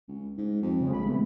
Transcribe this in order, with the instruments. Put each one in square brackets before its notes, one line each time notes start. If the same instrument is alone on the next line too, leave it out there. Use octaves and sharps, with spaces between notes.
[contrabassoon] C#2
G#2
F2
[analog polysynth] C#3 F3 G#3
[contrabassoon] A#1 [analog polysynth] B5
[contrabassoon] C2 [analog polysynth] E3 A3 B3